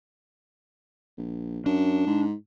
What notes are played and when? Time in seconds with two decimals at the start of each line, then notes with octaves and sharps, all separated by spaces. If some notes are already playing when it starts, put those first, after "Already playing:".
1.17 A#1
1.66 F#2 D4
2.07 G#2